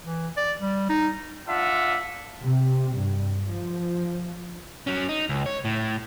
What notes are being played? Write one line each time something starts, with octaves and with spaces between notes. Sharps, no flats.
E3
D5
G3
D#4
D4 F4 E5 F#5
C3
G2
F3
F#3 C#4
D#4
C#2
C#5
A2